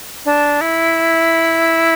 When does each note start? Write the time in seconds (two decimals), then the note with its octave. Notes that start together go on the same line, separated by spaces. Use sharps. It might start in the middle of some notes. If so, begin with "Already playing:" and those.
0.25 D4
0.61 E4